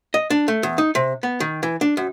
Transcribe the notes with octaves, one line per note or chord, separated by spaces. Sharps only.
D#5
D4
A3
E2
D#4
C3
B3
D#3
E3
D4
F#2